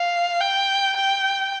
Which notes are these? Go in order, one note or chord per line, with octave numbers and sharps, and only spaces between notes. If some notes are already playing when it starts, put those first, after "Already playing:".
Already playing: F5
G5
G5